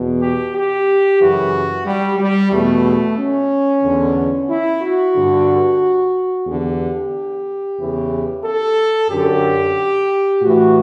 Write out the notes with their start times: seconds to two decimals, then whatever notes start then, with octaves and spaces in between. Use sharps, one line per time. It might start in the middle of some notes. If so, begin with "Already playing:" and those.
Already playing: E2 B2
0.21 G4
0.54 G4
1.20 F#2 C#3 E3 F#4
1.86 G3
2.19 G3
2.51 E2 B2 A3
3.18 C#4
3.83 E2 D3
4.49 E4
4.82 F#4
5.15 G2 D3
6.46 E2 D3 G4
7.78 E2 C#3 E3
8.44 A4
9.09 F#2 D3 G4
10.41 A2 E3 F#4